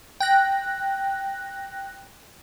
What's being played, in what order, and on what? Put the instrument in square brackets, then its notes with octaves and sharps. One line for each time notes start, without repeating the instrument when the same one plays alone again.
[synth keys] G5 F#6 A#6